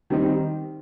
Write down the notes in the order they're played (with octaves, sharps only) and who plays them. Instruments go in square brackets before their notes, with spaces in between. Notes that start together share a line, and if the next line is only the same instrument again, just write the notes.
[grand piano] D#3 G3 C4 D#4